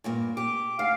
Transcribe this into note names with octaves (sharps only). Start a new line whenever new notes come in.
G2 A#2 A#3
G4 D6
D2 F5